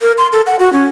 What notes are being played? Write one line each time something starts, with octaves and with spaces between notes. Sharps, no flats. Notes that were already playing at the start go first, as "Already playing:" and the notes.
A#4
C6
A4
F#5
F#4
C#4